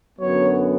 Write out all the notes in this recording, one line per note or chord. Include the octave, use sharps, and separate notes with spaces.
F#2 D3 F#3 B3 C#5